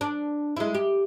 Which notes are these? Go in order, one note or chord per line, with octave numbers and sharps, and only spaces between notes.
D4
G#3 E4
G4